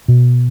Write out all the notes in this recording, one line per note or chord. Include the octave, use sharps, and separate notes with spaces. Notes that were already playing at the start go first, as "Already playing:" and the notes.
B2